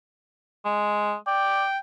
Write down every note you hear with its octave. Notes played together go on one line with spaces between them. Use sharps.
G#3
D5 G5